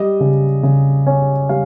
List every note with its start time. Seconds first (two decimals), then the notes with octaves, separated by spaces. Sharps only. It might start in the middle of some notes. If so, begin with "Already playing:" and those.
Already playing: G3 D#5
0.20 C#3
0.63 C#3
1.07 C#4
1.49 G3 F5